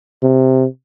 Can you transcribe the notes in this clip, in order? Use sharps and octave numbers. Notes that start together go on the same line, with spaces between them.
C3